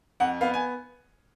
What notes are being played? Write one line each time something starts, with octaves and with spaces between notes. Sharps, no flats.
F2 F#5
B3 F5
G#5